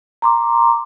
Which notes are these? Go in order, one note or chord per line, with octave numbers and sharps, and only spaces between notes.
A#5 C6 D6